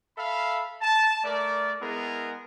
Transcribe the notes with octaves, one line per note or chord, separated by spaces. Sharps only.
A4 E5 F5 B5
A5
A3 A#4 D5
G#3 B3 E4 G#4 A#4